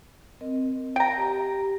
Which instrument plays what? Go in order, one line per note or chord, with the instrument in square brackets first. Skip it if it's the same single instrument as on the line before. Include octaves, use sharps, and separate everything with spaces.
[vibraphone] C4 A#4 D#5
[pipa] G5 A#5
[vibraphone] G4